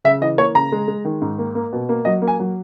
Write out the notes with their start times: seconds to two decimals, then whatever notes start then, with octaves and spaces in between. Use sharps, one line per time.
0.04 C#3 E5
0.21 E3 D#5
0.38 A#3 C#5
0.55 C#3 A#5
0.72 G#3
0.88 G#3
1.05 D#3
1.22 G#2
1.38 A#3
1.55 A#3
1.73 B2
1.89 A#3
2.05 F#3 D#5
2.22 A#3
2.28 G#5
2.40 F#3